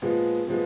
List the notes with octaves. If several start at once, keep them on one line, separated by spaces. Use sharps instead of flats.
A#2 F3 G#3 B3
A#2 F3 G#3 B3